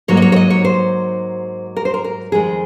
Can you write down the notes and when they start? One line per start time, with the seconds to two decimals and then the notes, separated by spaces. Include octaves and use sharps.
0.08 G#2 F#3 A#3 C#5
0.17 D#5
0.22 C#5
0.32 C#5
0.36 D#5
0.50 C#5
0.65 C5
1.77 A#4
1.85 C5
1.94 A#4
2.04 A#4
2.32 F2 D#3 G#3 G#4